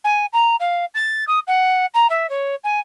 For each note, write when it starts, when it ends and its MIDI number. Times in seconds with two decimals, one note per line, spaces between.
0.04 0.26 80
0.33 0.56 82
0.60 0.85 77
0.95 1.24 93
1.27 1.39 87
1.47 1.86 78
1.94 2.07 82
2.10 2.29 76
2.30 2.55 73
2.64 2.80 80